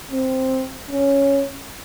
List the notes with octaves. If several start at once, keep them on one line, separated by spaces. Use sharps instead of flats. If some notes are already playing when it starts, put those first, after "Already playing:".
C4
C#4